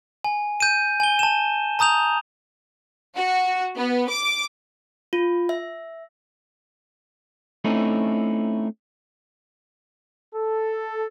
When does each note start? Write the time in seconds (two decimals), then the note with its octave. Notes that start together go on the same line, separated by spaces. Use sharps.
0.24 G#5
0.60 G6 D#7
1.00 G#5 G7
1.19 A5 E7
1.79 A5 A#5 D#6 G6 F7
3.16 F#4
3.76 B3
4.08 D6
5.13 F4
5.49 E5
7.64 A3 C4 C#4 D#4 E4
10.35 A4